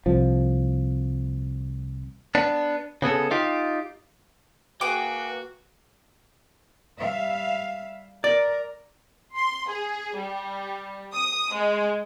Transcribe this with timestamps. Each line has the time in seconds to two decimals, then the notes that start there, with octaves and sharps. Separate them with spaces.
0.06 C2 F3
2.35 B3 D4
3.02 C#3 B3 G#4 A4
3.31 D#4 F4 G4
4.81 A#3 F#4 G#4 B4 G5 D6
6.97 G3 E5 F5
8.24 A#4 D5
9.36 C6
9.68 G#4
10.16 G3
11.13 D#6
11.53 G#3